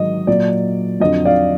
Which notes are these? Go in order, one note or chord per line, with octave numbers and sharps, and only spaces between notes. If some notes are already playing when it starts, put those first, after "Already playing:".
Already playing: G#2 D#3 F#3 D#5
A#2 F#3 D5
F2 D3 F#3 D#5
D5 F5